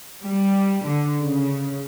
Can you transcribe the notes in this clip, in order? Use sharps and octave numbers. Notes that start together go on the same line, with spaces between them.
G3
D3
C#3